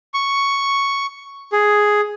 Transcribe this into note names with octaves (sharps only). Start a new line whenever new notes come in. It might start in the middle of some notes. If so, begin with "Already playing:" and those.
C#6
G#4